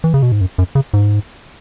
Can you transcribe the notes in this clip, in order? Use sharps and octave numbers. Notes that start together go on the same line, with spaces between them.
E3
C#3
B2
G#2
F#2
F#2
C#3
G#2